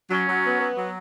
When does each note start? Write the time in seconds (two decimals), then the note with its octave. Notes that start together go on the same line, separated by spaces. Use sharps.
0.10 F#3 C#4
0.28 F#3
0.44 B3
0.60 B3
0.77 F#3